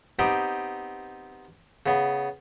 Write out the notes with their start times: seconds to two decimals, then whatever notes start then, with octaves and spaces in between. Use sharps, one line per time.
0.19 B3 C4 D#4 G4
1.86 C#3 B3